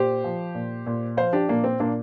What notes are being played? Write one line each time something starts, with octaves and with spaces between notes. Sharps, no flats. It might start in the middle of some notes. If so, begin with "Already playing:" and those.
Already playing: A#2 G4 C5
F3
A#2
A#2
F3 C5 F5
D4 G4
A#2 A#3 D4
C4
A#2 A#3 D4